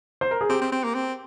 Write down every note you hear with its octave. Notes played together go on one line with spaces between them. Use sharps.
C5
A#4
G#4
C4 G4
C4
C4
A#3
C4